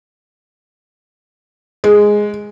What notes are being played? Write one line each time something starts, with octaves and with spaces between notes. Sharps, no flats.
G#3